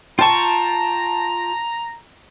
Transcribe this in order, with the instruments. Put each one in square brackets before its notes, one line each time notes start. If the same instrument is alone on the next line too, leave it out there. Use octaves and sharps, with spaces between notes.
[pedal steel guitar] F4 C#6 [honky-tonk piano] G5 A5 [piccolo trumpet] A#5